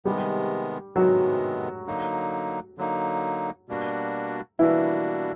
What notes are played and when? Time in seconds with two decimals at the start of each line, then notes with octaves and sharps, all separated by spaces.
0.05 C3 D#3 G3 G#3 B3 G4
0.96 C3 D#3 F#3 G#3 B3 F#4
1.87 D3 F#3 A#3 D#4
2.78 D3 F#3 A#3 D#4
3.69 B2 G3 A#3 D4 F#4
4.59 B2 E3 G3 A#3 D4 E4 F#4